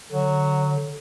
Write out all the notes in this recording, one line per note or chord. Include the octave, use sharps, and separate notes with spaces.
D3 F#3